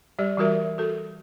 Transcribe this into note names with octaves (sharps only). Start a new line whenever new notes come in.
G3 G4 D5
E3 G3 F#4 A#4 E5
F#4 A4